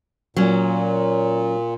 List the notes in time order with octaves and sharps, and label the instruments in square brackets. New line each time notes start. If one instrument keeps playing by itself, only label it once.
[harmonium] A#2 [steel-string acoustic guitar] F#3 C#4